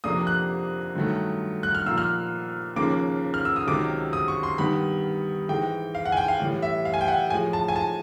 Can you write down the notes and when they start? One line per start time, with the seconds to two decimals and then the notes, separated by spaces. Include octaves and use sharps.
0.04 F2 C3 F3 A#3 D4 D#6
0.27 F#6
0.95 G2 D#3 F#3 A3
1.63 F#6
1.75 F6
1.86 A#2 F3 A#3 E6
1.98 F6
2.76 D#2 C#3 F3 A#3 D6
3.34 F6
3.45 E6
3.56 D#6
3.67 C#2 C3 D#3 F#3 D6
4.13 D#6
4.28 C#6
4.43 C6
4.58 G2 D#3 G3 B3 B5
5.49 G#2 E3 G#3 G5
5.95 F5
6.05 F#5
6.12 G#5
6.17 G5
6.28 F5
6.40 A2 E3 G3
6.62 E5
6.85 F5
6.94 G#5
7.01 G5
7.08 F#5
7.30 A2 F3 G#3 G#5
7.53 A5
7.68 G#5
7.76 A5